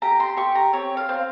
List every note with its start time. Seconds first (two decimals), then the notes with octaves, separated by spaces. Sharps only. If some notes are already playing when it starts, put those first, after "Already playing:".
0.02 G4 A#5
0.20 C6
0.37 G4 C#6
0.55 A#5
0.73 C4 C#5
0.97 F5
1.09 C4